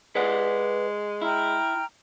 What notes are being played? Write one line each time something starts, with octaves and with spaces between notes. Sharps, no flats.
G#3 B4 D5 F#5
E4 G5 A#5 F6